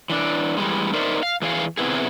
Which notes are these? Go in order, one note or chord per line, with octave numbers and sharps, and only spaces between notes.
E3 D4
E3 G3 G#3
D#4 A#4 C5 D5 E5
F5
E3 G#4 D#5 F5
C3 B3 E4 G#4